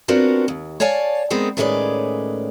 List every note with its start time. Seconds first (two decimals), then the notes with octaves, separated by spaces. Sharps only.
0.08 B3 C4 D4 F4 F#4 A#4
0.48 D#2
0.80 C#5 D5 F5 G#5 A5
1.30 D#3 G#3 B3 C4
1.57 A2 D#3 G#3 C#4 B4 D5